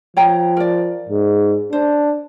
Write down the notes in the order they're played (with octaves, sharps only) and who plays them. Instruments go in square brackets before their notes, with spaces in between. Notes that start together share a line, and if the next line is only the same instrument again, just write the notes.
[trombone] F3 [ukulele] C#5 G5 A#5
[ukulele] A#4 D5
[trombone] G#2
[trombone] D4 [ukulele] C5